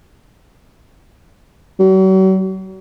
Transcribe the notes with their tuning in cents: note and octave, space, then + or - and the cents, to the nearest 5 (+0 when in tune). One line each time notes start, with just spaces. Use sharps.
F#3 +40